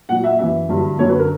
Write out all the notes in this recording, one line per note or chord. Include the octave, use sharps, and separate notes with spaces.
A#2 F#3 F#5
E5
F#2 E3 E5
G2 D3 F#3
F#2 D3 F#3 C#5
B4
A#4